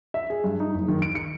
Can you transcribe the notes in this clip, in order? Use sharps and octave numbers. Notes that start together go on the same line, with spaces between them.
E5
G#4
G2
D#4
F#1
D#3
D7
C#7